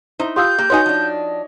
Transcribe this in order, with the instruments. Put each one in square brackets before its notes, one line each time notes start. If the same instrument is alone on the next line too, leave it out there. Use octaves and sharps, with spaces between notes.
[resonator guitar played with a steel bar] D#4 E4 [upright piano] C5
[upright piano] F4 G4 [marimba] C6 D#6 E6 [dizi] G6
[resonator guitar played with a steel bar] A#3 [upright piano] G4
[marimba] D#4 F#4 C6 [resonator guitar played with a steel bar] B4 F#5 G#5 [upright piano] C#5 D#5
[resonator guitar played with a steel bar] F3 D4